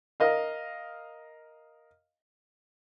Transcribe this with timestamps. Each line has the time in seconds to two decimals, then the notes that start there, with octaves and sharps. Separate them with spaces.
0.20 A#4 D#5 F5